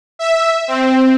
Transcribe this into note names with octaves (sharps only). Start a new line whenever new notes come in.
E5
C4